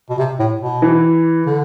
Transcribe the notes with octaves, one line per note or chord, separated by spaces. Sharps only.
B2
C3
A2
B2
E3
D3